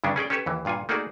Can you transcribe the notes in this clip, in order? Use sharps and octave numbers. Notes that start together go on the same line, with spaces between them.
G2 C#3 C#4 D4
C#4 G#4 D5 G5
C#4 G4 A4 B4 C#5
D#2 E3
G2 A#2 F4 F#5 G#5
A3 A#3 D#4 F#4 G#4 D5